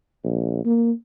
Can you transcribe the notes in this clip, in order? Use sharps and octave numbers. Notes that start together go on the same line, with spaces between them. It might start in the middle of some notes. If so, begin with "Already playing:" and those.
A#1
A#3